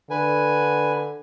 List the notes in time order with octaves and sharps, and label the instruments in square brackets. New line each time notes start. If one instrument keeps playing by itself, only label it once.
[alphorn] D3 [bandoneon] B4 G#5